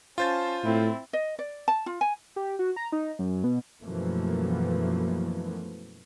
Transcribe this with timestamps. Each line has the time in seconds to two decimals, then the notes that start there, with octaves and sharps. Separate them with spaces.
0.18 C#4 F4 C5 A5 A6
0.63 A2 C4 E4
1.13 D#5
1.39 D5
1.68 A5
1.86 F4
2.01 G#5
2.36 G4
2.59 F#4
2.76 A#5
2.92 D#4
3.19 F#2
3.44 B2
3.81 F#2 B2 E3 F3 A3 A#3